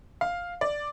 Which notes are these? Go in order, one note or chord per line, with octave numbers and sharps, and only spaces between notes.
F5
D5